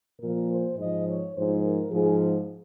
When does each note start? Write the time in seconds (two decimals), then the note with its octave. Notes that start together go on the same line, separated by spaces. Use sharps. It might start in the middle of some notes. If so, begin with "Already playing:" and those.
0.20 A#2 F3 A#4
0.49 C5
0.77 G#2 F3 D#5
1.06 C#5
1.35 G#2 F3 C5
1.63 A#4
1.91 G#2 F3 G#4